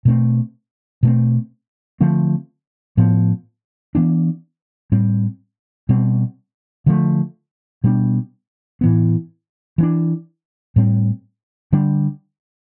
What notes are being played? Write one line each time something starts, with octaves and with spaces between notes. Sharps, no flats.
B2 A3 C4
B2 A3 C4
D3 F3 A3 C4
A2 F3 B3
E3 B3 D4
A2 G3 C4
B2 G3 C4
D3 F3 A3
B2 G3 B3 D4
A2 E3 B3
E3 B3 D4
A2 G3 C4
D3 G3 D4